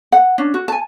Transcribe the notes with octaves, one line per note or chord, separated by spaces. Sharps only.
F#5
C#4 D4
F#4
G#5 A5